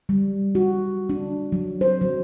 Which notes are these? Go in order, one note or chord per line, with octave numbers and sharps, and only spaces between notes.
G3
F#4
D4
F#3
C5
F#3